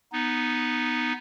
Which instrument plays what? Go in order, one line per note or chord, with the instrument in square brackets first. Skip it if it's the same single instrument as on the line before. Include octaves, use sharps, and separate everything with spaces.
[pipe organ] B3 D#4